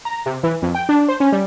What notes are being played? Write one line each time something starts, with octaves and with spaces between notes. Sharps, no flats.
A#5
C3
E3
F2
G5
D4
C5
C#4
G3